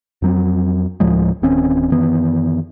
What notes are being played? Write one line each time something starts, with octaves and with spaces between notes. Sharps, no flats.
F2 F#3 C4
D2 A2 F3 G#3
D1 D#3 C4 C#4
F#2 D#3 E3 B3